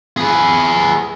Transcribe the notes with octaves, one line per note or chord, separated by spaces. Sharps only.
G#4 B4